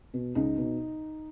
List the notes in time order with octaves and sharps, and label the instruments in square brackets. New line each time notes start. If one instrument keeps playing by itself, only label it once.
[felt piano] B2
C#2 D#4
B2